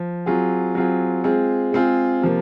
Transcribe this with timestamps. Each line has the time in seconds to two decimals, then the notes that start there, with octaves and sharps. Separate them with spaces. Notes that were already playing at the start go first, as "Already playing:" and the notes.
Already playing: F3
0.26 F#3 C4 F4 G#4
0.75 F#3 C4 F4 G#4
1.24 G#3 C4 F4 G#4
1.72 G#3 C4 F4 G#4
2.22 C3 F3 A#3